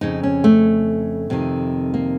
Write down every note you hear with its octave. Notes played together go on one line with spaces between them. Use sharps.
F2 C#3 D#4
C#4
A3
F2 C3 D#3
A#3